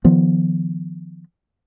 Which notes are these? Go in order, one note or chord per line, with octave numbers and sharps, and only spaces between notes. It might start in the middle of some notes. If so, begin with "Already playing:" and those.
D#3 F3 B3